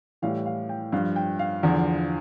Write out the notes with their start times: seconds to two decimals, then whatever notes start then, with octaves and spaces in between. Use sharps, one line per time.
0.22 A2 E3 G3 F5
0.46 F5
0.69 G5
0.93 G2 F3 F5
1.16 G5
1.39 F5
1.63 E2 D3 F3